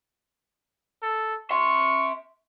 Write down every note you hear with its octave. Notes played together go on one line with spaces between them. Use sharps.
A4
E5 C6 C#6